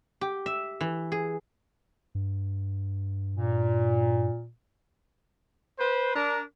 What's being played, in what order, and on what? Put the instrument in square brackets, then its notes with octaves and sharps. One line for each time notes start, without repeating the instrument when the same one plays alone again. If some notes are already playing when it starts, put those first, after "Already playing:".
[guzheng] G4
E5
E3
G#4
[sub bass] G2
[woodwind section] A#2
[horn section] B4 C5
D4 A#4